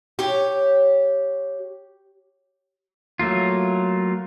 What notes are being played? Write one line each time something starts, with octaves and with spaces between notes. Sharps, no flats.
G4 C#5
F#3 A3 A#3 F4